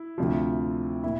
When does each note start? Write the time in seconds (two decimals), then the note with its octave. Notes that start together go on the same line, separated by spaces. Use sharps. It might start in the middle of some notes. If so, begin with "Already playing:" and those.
Already playing: E4
0.18 D2 C3 F3
1.04 A#2 E4